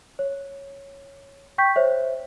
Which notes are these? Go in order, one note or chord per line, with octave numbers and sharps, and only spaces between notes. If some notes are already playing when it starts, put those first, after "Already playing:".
C#5
G5 C#6 G6 B6
C5 C#5 E5